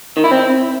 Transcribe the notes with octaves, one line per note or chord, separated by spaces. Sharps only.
D#3
E4
C4